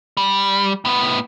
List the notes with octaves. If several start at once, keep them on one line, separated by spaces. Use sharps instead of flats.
G3
A2 B3